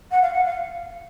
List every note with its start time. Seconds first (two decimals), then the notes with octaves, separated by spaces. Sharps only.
0.11 F#5
0.22 F5
0.33 F#5
0.45 F5